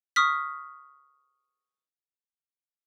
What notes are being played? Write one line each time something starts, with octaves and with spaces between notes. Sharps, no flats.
C#6 D#6 F6 B6